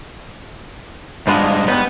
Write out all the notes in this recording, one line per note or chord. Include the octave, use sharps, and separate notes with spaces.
G2 G#3 B3 D4 F4
G3 G#3 B3 D#4